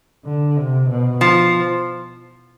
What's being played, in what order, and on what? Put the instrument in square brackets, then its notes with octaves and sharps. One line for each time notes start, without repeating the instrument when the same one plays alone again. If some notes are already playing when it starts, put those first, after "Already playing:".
[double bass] D3
C3
B2
[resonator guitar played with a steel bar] F3